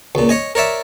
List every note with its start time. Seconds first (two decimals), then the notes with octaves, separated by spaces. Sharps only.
0.15 C#2 A#2
0.29 C#5 D#5 G#5
0.55 A#4 C#5 D5 E5